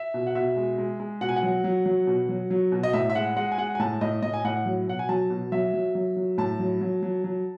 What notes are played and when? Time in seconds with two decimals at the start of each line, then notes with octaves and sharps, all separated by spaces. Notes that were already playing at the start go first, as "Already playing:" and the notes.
Already playing: E5
0.14 B2
0.27 F#5
0.35 B2 E5
0.57 G#3
0.78 G#3
1.00 G#3
1.21 B2 F#5
1.29 G#5
1.36 F#5
1.43 F#3
1.64 F#3
1.86 F#3
2.07 B2
2.29 F#3
2.50 F#3
2.72 B2
2.83 D#5
2.93 A2 E5
3.10 E5
3.15 G#3 F#5
3.36 G#3 F#5
3.52 G#5
3.58 G#3 F#5
3.75 G#5
3.79 A2 A5
4.01 A2 D#5
4.22 A2 D#5
4.34 G#5
4.44 A2 F#5
4.66 F#3
4.88 B2 F#5
4.99 G#5
5.09 F#3 A5
5.30 B2
5.52 F#3 E5
5.74 F#3
5.95 F#3
6.17 F#3
6.38 A2 A5
6.59 F#3
6.81 F#3
7.03 F#3
7.24 F#3